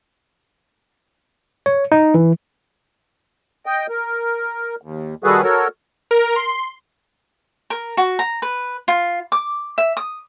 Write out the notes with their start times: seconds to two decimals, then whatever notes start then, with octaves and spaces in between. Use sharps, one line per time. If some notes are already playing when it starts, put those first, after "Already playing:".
1.66 C#5
1.92 D#4
2.14 E3
3.66 D#5 G5
3.89 A#4
4.82 D#2
5.24 D#3 G3 F#4 G#4 A4 B4
5.43 F#4 A4 A#4 C#5
6.11 A#4
6.36 C6
7.70 A#4
7.97 F#4
8.19 A#5
8.42 B4
8.88 F4
9.32 D6
9.78 E5
9.97 D#6